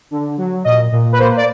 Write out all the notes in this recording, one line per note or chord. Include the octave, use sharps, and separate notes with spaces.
D3
F#3
A#2 D#5
A#2
B4
A#3 C5
D5